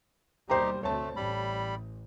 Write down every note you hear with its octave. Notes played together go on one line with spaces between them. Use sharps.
D#2 B2 G3 D#4 G4 C5 G5 A#5
D2 A3 C4 C#5 A5
A1 G3 B5